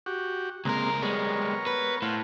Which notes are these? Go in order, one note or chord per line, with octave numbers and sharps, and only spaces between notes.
F#4 G4
C#2 G#3 A#3 C4 A#4
G3 G#3 B3 A#4 C#5
B4
A2 C5 F5 F#5